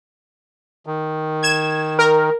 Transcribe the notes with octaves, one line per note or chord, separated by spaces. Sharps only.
D#3
G#6 E7
A#4